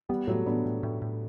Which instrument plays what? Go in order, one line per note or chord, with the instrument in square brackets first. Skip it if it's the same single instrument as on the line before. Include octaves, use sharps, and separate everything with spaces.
[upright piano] G3 [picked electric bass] B3
[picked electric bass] A2 [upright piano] F#3 A3
[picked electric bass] A2 [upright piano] B3 D4
[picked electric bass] A2
A2
A2